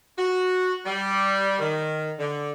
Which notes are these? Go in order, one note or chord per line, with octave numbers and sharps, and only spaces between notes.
F#4
G3
D#3
D3